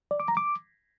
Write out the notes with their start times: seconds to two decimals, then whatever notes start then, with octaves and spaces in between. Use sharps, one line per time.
0.11 D5
0.20 D6
0.28 A#5
0.37 D6